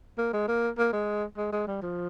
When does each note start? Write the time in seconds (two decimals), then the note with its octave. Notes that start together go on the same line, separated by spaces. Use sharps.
0.18 A#3
0.33 G#3
0.48 A#3
0.78 A#3
0.92 G#3
1.37 G#3
1.52 G#3
1.67 G3
1.82 F3